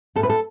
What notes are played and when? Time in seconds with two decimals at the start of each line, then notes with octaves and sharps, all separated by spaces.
0.16 A2 A4
0.23 B4
0.30 A4